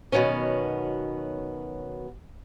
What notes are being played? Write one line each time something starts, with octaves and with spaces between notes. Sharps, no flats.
B2 D#3 F#3 B3 C#4